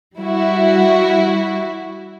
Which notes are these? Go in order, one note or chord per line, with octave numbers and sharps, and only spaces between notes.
G3 E4 F#4